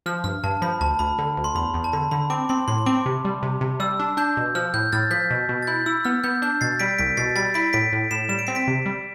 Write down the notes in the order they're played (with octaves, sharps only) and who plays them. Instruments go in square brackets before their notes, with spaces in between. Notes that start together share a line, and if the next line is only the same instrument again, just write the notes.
[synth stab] F3 [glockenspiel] F6
[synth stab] G2 [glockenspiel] F6
[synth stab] G2 [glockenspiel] A5
[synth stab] F3 [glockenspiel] B5
[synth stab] D2 [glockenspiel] A5
[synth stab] D2 [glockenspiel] B5
[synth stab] D3
D2
[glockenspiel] C6
[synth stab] E2 [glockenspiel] B5
[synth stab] E2
[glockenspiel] A5
[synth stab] D3 [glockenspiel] B5
[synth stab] D3 [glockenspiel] B5
[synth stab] C4 [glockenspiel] D6
[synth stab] C4 [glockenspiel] C6
[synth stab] A2 [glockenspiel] C6
[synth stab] C4 [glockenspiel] D6
[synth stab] C3
G3
C3
C3
[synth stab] G3 [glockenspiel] E6
[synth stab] D4
[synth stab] D4 [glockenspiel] G6
[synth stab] B2
[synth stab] F3 [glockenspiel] F6
[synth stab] A2 [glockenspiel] G6
[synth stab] A2 [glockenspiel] F6 A6
[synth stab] F3 [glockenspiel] G6 B6
[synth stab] B2
B2
[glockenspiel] A6
[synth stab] E4 [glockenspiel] G6
[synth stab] E4 [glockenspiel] E6
[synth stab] B3 [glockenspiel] F6
[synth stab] B3 [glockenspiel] G6
[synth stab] D4 [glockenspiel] G6
[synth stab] B2 [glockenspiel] A6 C7
[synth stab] G3 [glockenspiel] B6 D7
[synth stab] C2 [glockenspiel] B6 D7
[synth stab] B2 [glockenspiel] A6 C7
[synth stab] G3 [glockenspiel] A6 C7
[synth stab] E4 [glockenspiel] B6 D7
[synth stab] A2 [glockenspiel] B6 D7
[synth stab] A2
[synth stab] A2 [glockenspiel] C7 E7
[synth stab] G3 [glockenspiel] E7
[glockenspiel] D7
[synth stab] C4 [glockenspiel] C7
[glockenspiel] B6 D7
[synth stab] C3
G3